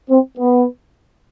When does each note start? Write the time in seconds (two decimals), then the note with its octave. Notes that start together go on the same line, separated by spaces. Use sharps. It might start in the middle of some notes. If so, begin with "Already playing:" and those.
0.09 C4
0.38 B3